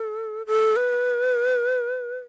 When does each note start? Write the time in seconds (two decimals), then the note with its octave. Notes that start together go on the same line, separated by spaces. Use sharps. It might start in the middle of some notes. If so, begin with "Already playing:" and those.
Already playing: A4
0.47 A4
0.76 B4